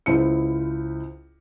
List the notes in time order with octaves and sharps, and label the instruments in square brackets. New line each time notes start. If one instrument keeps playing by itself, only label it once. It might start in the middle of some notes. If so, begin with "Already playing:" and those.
[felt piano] C#2 E4 C5 C#7